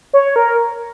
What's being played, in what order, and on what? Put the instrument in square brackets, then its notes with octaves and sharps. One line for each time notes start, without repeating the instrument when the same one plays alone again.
[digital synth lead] C#5
A#4